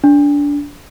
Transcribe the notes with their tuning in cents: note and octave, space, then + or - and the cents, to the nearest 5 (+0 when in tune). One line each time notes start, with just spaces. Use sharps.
D4 -25